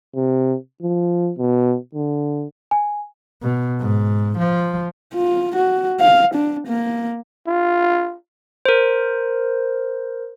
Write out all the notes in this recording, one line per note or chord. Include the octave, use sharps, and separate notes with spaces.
C3
F3
B2
D3
G#5
B2
G#2
F3
F4
F#4
F5
D4
A#3
F4
A#4 C5